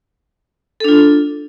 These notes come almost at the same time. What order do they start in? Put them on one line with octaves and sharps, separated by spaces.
A4 D4 F4